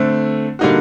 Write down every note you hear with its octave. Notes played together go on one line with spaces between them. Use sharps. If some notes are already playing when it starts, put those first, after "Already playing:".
Already playing: D3 A3 C4
D3 G3 A#3 D#4 F#4